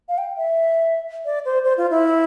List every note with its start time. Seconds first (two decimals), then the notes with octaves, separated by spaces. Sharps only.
0.09 F5
0.18 G5
0.37 E5
1.25 D5
1.45 C5
1.64 C5
1.77 F4
1.90 E4